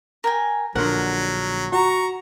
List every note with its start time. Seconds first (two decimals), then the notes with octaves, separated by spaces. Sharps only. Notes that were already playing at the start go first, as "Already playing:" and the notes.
0.24 A#4 G5 G#5
0.75 A#1 D3 F#3 A#4 F#5 C6
1.72 F#4 A#5 C#6